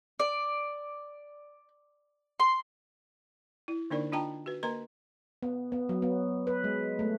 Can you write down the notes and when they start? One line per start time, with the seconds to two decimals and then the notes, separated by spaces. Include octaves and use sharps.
0.20 D5
2.40 C6
3.68 E4
3.90 D3 A#3 D4 D#4 A#4 D5
4.12 D4 F4 D#5 G5 A5 A#5
4.46 F#4 B4
4.63 A#3 A#4 B4 D#5 A#5 C6
5.43 B3
5.72 B3
5.89 F#3
6.02 B3
6.47 B4
6.64 G#3
6.99 A3